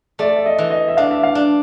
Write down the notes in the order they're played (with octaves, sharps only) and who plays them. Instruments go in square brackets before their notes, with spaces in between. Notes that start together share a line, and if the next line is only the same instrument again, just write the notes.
[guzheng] A3 [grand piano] D5
[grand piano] E5
D#5
[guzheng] E3
[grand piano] D#5
E5
[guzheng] D4 [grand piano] F5
[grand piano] E5
F5
[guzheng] D4